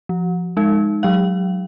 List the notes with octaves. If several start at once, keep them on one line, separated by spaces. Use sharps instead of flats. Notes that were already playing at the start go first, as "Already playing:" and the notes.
F3
G#3 D#4
F#3 F5